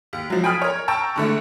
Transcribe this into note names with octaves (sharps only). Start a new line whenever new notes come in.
D#2
F3 F#3
G5 G#5 B5 D#6 F6
A#4 C#5
G5 A5 A#5 C#6 E6
F#1 D3 A3